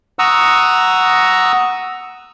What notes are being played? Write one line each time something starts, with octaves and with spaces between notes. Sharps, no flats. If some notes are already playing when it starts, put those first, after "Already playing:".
F#5 A#5 C#6 D#6 E6